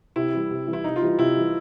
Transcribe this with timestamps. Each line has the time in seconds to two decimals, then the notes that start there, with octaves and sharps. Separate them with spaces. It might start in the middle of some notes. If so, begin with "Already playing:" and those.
0.16 C3 E4
0.33 E3 G3
0.51 C3
0.67 E3 G3
0.73 E4
0.84 C3 D#4
0.96 F4
1.02 E3 G3
1.07 F4
1.18 C3 E4
1.36 E3 G3